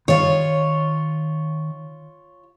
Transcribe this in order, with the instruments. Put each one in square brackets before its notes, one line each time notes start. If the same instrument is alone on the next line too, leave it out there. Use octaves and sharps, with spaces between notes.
[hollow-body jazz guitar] D#3 F5 [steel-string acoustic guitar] F4 C#5